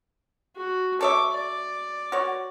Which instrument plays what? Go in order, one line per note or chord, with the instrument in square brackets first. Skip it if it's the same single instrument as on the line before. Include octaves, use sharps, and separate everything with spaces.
[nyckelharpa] F#4
[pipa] A4 C#5 E5 [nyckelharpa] D6
[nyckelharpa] D5
[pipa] F#4 C#5